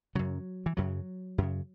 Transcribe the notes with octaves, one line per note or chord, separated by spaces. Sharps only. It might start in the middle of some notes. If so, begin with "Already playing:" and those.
F#2 C#3 F#3
E3
F#2 C#3 F#3
F#2 C#3